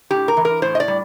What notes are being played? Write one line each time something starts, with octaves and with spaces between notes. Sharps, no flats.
A2 G4
A#4
E3
A#4
A2 C5
D#5
D5
G3